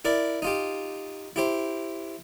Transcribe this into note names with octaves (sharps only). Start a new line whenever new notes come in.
E4 A#4 D5
D#4 F4 G4
E4 G4 C5